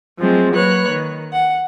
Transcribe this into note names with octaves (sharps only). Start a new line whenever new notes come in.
F3 F#3 G#3 A3 C4
F#3 A#3 B4 C#5 F#6
D#3
F#5